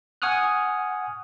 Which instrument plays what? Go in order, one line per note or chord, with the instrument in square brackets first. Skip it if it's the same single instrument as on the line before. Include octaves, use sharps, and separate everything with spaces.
[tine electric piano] F#5 G#5 C#6 D#6 F6 F#6